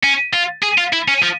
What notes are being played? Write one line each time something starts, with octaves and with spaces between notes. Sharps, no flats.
C#4
F4
G#4
F4
E4
C#4
F3